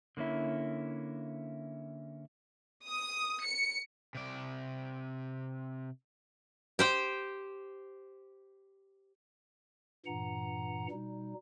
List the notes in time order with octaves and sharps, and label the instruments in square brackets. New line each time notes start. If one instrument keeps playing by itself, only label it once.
[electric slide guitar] D3 A#3 C#4 E4
[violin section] D#6
C#7
[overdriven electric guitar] C3 D5
[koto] G4 C5 G5
[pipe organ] G2 A#2 E3 F#5 A#5
B2 G3 D#4